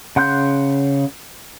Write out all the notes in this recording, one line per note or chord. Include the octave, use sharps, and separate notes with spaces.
C#3 F#5 C6 F#6 G6